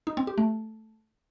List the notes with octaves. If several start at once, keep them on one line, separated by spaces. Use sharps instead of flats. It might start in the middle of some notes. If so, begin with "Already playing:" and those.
D#4
C4
G4
A3